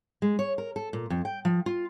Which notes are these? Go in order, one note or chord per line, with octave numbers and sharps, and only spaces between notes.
G#3
C#5
A#4
A4
A#2
F2
G5
F3
F4